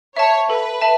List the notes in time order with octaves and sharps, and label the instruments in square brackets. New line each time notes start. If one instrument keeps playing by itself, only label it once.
[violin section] C#5 [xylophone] E5 A5
[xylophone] A4 [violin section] B4
[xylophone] E5 A5